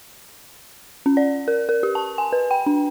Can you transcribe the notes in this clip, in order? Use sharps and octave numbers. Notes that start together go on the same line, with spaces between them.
C#4
D5
A#4
A#4
G4
A5
G#5
B4
G5
D4